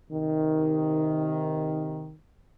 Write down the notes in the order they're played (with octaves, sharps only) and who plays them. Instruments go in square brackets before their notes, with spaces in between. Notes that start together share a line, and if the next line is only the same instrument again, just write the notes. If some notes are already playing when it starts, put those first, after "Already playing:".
[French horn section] C3 D#3